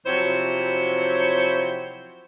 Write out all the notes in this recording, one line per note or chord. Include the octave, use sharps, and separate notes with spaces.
C3 F3 F#3 E4 C5 C#5